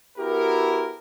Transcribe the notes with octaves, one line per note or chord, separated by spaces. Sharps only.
B3 E4 F#4 G4 A4 A#4